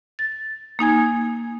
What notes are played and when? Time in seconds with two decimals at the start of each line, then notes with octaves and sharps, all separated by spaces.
0.19 A6
0.79 A#3 D#4 G#5 G#6